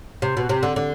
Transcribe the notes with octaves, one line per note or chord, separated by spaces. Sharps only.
C3
B2
C3
D3
D3